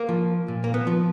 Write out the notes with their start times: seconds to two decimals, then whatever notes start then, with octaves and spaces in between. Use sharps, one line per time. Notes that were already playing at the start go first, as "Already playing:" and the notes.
Already playing: A#3
0.09 F3
0.48 A#2
0.64 A#3
0.74 B3
0.87 F3